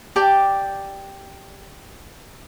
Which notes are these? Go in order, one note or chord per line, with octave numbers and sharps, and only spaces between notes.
G4 D5 G5 A5